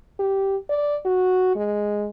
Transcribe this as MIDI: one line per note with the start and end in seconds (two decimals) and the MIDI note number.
0.19 0.57 67
0.69 0.99 74
1.05 1.52 66
1.55 2.07 56